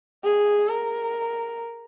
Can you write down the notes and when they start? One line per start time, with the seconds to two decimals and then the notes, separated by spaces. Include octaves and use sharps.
0.24 G#4
0.68 A#4